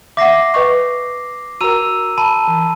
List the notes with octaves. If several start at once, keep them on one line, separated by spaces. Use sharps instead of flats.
E5 F#5 D6 A#6 C7
B4 D#5 C#6
F#4 A#4 A#5 E6 D#7
A5 B5 D#7
E3